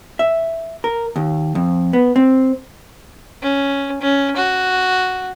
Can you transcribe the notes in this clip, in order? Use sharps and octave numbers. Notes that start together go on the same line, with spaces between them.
E5
A#4
D#2
F2
B3
C4
C#4
C#4
F#4